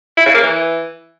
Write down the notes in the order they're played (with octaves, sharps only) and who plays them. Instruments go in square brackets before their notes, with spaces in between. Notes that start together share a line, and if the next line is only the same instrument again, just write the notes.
[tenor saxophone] E4
C#3
A#3
E3